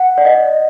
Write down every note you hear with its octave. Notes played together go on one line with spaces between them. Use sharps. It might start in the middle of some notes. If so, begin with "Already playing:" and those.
Already playing: F#5
D5
D#5